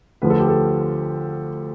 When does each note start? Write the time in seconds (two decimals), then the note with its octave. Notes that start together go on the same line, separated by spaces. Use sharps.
0.22 D2 D3 F3 B4
0.30 A4
0.39 G4
0.48 A4